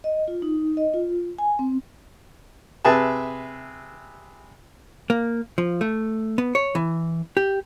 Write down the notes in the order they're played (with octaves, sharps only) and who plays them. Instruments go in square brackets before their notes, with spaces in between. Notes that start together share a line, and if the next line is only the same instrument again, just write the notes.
[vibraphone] D#5
F4
D#4
D#5
F4
G#5
C4
[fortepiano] C3 G#4 B4 E5 A5
[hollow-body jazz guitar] A#3
F3
A3
B3
C#5
E3
G4